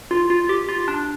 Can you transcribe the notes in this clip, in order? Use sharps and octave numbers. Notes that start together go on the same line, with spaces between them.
F4
F4
G4
F4
D4